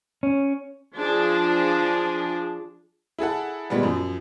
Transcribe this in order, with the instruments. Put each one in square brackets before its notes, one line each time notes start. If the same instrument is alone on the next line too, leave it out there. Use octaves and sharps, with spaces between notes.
[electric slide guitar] C#4
[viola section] F3 D4 G#4
[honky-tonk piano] E4 G#4 A4 F#5
A#2 G3 G#3 B3
F#2 F3